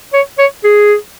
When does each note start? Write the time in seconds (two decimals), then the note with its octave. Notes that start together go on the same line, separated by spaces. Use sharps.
0.13 C#5
0.38 C#5
0.64 G#4